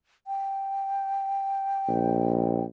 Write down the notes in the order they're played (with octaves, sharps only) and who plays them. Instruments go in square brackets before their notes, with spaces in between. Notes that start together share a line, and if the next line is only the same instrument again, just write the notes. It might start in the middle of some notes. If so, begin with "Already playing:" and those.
[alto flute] G5
[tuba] A#1